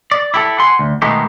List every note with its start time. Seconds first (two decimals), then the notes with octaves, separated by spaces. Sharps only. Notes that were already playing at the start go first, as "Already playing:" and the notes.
0.11 D5
0.34 E4 G4 A4
0.59 F#5 G#5 C6
0.79 D2
1.02 B2 D#3 G#3 A3 B3 G4